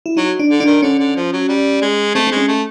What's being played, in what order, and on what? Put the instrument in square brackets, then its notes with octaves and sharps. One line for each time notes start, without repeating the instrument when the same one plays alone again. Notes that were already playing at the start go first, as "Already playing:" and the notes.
[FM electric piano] E4
[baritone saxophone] F#3 [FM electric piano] D#4
[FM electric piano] D4
[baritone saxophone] D3
[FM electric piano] D4
[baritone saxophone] D#3
[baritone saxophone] D3 [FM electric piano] C#4
[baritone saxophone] D3
F3
F#3
G3
G#3
[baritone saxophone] A3 [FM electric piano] C4
[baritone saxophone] G#3 [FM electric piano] C4
[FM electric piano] C#4
[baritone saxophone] A3